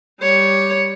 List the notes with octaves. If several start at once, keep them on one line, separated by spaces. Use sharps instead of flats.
G3 C#5